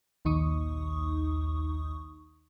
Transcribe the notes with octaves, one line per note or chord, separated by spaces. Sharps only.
A#1 D#2 D#4 C#6 D#6